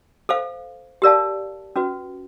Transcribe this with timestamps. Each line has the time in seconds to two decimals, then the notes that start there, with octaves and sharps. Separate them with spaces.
0.29 A4 C5 F5
1.02 G4 A#4 D5 F5 A5
1.76 C#4 F#4 B4